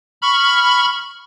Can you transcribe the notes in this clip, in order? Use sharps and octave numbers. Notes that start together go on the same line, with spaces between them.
B5 C#6 F6